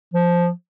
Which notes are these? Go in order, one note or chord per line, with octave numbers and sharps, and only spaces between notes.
F3